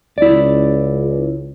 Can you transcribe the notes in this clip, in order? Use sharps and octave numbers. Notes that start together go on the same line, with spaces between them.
C#2 E4 D5